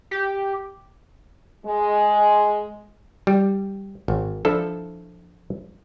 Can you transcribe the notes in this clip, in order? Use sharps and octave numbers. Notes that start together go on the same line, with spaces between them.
G4
G#3
G3
G#1
F3 D4 E4 A4